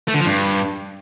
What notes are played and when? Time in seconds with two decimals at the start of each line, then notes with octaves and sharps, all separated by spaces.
0.08 A3
0.14 D3
0.20 F3
0.26 G2